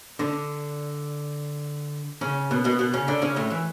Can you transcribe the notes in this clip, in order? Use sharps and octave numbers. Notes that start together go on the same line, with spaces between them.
D3 D4
C#3 C#4
B2 B3
B2 B3
B2 B3
C#3 C#4
D3 D4
C#3 C#4
A2 A3
E3